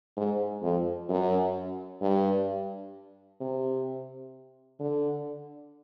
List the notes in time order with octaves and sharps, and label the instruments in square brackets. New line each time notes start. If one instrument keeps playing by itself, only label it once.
[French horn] G#2
F2
F#2
G2
C3
D3